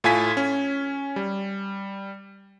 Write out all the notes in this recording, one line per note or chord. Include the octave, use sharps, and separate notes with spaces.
A2 F4 A4 G#5 G#6 B6
C#4
G3